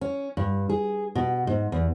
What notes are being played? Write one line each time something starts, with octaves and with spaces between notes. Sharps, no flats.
C#4
G2
G#4
B2
G#2
E2